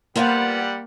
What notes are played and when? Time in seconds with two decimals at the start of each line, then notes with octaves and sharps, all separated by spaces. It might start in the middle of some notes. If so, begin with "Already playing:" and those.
0.16 G3 A#3 B3 F4 B4 C5 F5 F#5